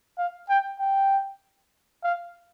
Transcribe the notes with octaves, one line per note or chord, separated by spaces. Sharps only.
F5
G5
G5
F5